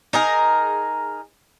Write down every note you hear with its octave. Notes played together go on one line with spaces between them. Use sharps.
D#4 G#4 A#4